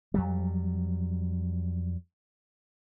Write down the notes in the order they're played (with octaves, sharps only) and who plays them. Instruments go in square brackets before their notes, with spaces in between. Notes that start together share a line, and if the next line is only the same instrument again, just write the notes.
[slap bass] F2 F#3 G3